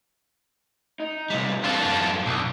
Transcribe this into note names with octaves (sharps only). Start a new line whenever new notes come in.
D#4
C#2 G2 C3 G3
C4 D4 F4 A4
F#2 D4
B1